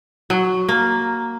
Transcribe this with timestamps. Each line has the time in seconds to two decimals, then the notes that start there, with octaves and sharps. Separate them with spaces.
0.30 F#3
0.69 A#3